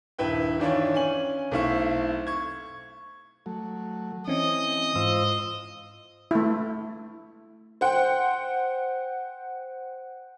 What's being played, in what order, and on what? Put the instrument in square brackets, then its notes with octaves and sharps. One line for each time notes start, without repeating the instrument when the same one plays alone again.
[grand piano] D#1 G2 E4 B4 G5
D#3 E3 D4 F4 C#5
C#4 G#5 F#7
B1 A3 C4 E4 F5 C#6
C#6 G#6
[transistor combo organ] F#3 A3
[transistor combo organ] E3 [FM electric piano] C4 C#4 [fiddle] D#5
[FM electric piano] G#2 [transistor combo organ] F4 C5 E6
[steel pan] A3 E4
[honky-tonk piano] C5 F#5 G5